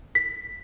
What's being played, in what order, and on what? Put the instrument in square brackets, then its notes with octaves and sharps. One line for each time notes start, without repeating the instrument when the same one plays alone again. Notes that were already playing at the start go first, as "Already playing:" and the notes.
[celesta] B6